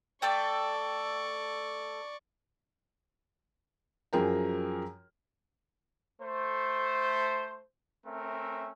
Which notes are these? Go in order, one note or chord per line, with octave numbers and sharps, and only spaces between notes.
A3 A4 D5 G5 C#6
F#2 F3 G#4 A#4 G5 A#5
A3 C5
A3 C4 C#4 A#4 E5